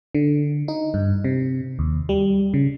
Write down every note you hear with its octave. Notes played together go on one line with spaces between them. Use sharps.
D3
D#4
G2
C3
D#2
G3
C#3